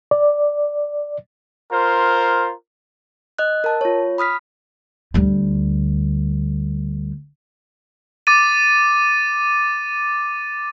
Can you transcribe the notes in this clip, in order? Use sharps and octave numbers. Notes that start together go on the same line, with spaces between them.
D5
F4 A#4 C5
D#5 F#6
A#4 A5
F4 C#5
B5 D#6 F6 B6
D2 G3
D6 A6 D#7